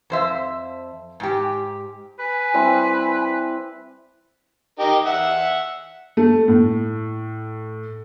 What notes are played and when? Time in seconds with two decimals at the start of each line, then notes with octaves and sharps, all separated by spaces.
0.10 F2 C5 E5
1.20 G#2 G4
2.19 B4 G#5
2.54 G3 C4 E4
4.79 D#4 G4 A#4
5.06 E5 F#5
6.17 A3
6.48 A2